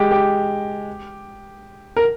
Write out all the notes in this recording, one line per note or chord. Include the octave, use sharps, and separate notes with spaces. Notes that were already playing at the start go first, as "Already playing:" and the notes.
Already playing: G#3 G4
G4
A#4